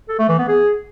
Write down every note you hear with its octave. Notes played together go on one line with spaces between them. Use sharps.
A4
A3
E3
B3
G#4